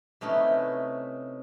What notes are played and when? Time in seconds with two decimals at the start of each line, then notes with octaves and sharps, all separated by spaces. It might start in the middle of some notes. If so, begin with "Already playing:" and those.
0.21 C3 A3 C#4 D#4 E4 B4